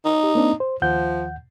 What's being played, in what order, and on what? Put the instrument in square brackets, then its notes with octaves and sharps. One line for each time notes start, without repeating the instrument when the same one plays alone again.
[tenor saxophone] D#4
[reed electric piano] G4
A#3 C4 D4
C5
[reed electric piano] D#2 F#5 G6 [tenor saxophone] F3